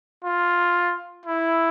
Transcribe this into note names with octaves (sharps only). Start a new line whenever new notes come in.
F4
E4